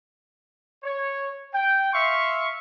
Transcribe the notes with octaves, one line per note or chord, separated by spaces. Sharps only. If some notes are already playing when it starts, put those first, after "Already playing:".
C#5
G5
E5 F5 C6 C#6